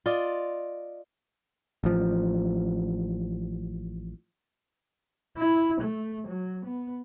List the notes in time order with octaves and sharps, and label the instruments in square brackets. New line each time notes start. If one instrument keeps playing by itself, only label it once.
[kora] F4 D5 D#5
[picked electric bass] A1 F3
[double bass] E4
A3
F#3
B3